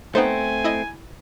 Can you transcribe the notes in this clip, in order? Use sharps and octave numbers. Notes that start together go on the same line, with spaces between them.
A3 B3 C4 D#4 C5 G#5
E4 D#5